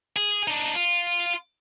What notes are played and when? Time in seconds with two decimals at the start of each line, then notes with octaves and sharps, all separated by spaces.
0.16 G#4
0.48 D4 D#4
0.75 F4